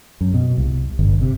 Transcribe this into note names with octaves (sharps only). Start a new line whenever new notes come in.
F#2
B2
C2
G1
C3